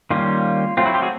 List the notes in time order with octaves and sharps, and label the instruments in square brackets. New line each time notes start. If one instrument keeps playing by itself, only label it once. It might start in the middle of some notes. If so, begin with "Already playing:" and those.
[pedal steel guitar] D#3 G3 A#3 C#4 F4
F#3 A3 C4 F4
E4 F#4
F4 G4
F#4 G#4